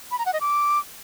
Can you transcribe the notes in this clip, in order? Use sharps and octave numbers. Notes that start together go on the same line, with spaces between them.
B5
A#5
F#5
D#5
D6